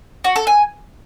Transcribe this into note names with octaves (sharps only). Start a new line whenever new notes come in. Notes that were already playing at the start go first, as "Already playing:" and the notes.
F#4
A4
G#5